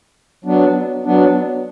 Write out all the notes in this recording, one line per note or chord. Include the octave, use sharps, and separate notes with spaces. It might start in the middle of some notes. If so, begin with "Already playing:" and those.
F#3 B3 D4
F#3 B3 D4